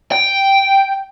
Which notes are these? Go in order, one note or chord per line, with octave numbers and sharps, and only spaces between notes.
G5